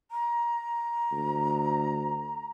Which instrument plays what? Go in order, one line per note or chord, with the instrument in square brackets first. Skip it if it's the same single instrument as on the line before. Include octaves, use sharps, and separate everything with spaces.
[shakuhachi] A#5
[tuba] D2